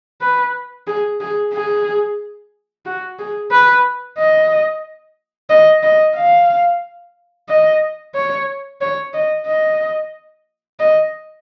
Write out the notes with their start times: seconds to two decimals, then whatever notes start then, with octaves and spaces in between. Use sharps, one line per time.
0.21 B4
0.87 G#4
1.20 G#4
1.54 G#4
2.85 F#4
3.19 G#4
3.51 B4
4.18 D#5
5.50 D#5
5.83 D#5
6.16 F5
7.48 D#5
8.15 C#5
8.81 C#5
9.14 D#5
9.47 D#5
10.79 D#5